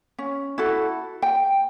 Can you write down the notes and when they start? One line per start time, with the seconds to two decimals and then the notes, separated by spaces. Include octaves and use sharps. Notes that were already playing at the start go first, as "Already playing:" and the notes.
0.19 C#4
0.58 E4 F#4 A4
1.22 G5